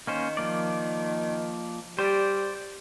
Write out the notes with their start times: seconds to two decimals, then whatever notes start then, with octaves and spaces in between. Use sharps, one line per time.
0.07 D#3 A#3 C#4 C5
0.37 F3 A#3 D5
1.99 G3 C5 D5